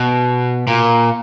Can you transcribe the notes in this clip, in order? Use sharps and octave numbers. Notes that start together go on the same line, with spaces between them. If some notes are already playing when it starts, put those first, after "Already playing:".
Already playing: B2
A#2